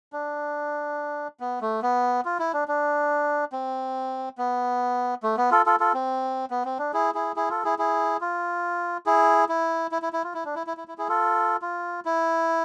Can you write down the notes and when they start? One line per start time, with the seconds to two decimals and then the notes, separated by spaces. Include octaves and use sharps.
0.13 D4
1.40 B3
1.61 A3
1.82 B3
2.25 F4
2.39 E4
2.54 D4
2.68 D4
3.52 C4
4.38 B3
5.23 A3
5.37 B3
5.51 F4 A4
5.66 F4 A4
5.80 F4 A4
5.94 C4
6.51 B3
6.65 C4
6.79 D4
6.93 E4 G#4
7.14 E4 G#4
7.36 E4 G#4
7.50 F4 A4
7.64 E4 G#4
7.79 E4 G#4
8.21 F4
9.06 E4 G#4
9.49 E4
9.92 E4
10.02 E4
10.13 E4
10.24 F4
10.34 E4
10.45 D4
10.55 E4
10.67 E4
10.77 E4
10.88 E4
10.98 E4 G#4
11.09 F4 A4
11.62 F4
12.05 E4